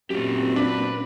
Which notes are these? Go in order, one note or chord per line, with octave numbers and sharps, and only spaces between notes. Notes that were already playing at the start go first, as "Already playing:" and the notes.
F#2 A#2 A#3 C4 F4 G4
D4 B4 B5